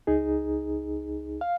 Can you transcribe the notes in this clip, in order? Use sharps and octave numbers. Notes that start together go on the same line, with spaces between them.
C#2 D#4 G#4
F5